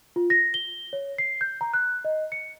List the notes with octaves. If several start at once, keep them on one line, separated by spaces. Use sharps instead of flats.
F4
A#6
G7
C#5
C7
G6
A#5
F#6
D#5
C#7